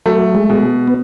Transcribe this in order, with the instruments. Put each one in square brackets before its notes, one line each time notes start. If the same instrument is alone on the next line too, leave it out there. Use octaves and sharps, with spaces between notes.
[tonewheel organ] F#3 [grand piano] A3
[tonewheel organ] G#3
[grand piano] B2
[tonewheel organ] B3